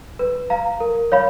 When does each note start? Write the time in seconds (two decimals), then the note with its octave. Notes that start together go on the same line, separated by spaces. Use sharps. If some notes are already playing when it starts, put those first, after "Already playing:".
0.19 B4
0.50 F5 A#5
0.80 A#4
1.12 C#5 F5 B5